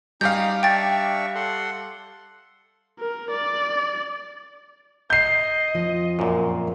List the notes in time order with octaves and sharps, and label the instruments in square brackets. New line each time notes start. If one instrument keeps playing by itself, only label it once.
[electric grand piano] G3 G4 F5 [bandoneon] C#4 D#4 [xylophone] G6
[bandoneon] D4 E5 C#6 [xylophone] G5 A6
[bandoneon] A4 F#5 C6
[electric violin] A#4
D5
[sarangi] D#5 [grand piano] G6 C7
[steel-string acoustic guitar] F2 F3
[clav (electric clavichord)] F#2 A#2